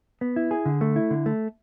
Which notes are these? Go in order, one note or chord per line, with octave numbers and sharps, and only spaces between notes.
B3
E4
G#4
D3
A3
E4
D3
A3